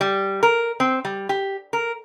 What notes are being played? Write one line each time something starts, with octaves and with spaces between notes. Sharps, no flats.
G3
A#4
C4
G3
G4
A#4